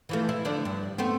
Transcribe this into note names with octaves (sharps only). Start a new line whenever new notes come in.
E3 F3 A3
E4
D3 F3 D4
G2
A3 B3 C4